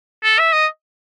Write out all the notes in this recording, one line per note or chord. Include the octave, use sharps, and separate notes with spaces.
A4
E5
D#5